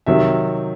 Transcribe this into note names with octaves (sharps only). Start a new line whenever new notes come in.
C3 D#3 F#3 E5